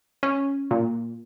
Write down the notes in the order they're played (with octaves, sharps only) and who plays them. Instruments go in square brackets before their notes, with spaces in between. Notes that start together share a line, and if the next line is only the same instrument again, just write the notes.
[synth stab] C#4
A#2